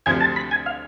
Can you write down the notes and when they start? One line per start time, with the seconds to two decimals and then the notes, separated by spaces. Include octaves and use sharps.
0.06 D2 C3 F3 G#5
0.21 A5
0.36 B5
0.51 G#5
0.66 F5